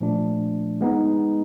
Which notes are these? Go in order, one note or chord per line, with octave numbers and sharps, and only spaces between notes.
A#2 F3 A3 D4
G#3 B3 D#4